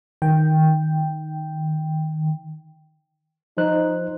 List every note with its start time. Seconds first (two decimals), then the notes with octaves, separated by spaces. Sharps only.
0.22 D#3 G5
3.57 F3 D#4 C5 F#6